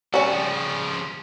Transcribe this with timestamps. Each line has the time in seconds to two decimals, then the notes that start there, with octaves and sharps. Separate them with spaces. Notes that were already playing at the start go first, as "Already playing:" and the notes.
0.14 B2 G3 C#4 F#4
0.31 C#3 F3